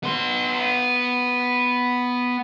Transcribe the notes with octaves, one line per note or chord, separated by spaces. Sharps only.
B3 C6